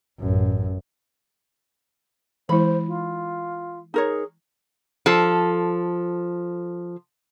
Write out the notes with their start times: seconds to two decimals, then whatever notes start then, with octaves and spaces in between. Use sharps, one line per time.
0.20 A1 F#2
2.49 E3 G#3 E4 C5 B5
2.88 F4
3.94 D#4 G#4 A#4 C#5
5.06 F3 A4